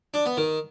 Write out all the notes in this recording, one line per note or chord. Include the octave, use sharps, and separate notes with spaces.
D4
B3
D#3